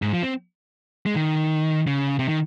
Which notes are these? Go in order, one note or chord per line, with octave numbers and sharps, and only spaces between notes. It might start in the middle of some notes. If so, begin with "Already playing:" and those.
G#2
F3
C4
G#3
D#3
C#3
C3
D#3